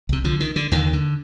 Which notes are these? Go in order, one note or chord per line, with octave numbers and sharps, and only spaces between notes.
C2 C3
D3 F3
D#3
D3
D#2 D3 D#3
D3